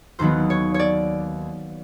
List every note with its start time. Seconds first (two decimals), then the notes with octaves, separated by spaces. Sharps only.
0.19 D#2 D#3 F#3 B3 C5
0.50 C#5
0.74 C#5
0.79 D5